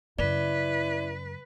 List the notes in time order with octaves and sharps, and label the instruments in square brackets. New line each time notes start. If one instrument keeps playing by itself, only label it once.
[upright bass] F#2 C#3 [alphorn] E4 [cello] B4 [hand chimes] D5